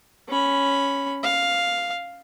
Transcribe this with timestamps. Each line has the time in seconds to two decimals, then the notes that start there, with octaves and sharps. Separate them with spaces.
0.29 C#4 B5
1.23 F5